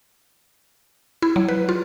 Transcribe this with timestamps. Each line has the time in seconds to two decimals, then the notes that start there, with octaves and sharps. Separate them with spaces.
1.22 E4
1.36 F#3
1.48 B4
1.69 F4